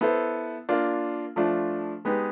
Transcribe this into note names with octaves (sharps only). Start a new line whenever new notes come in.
B3 E4 A4 C5
A#3 D4 F4
F3 A3 D4 F4
G#3 B3 D#4 G4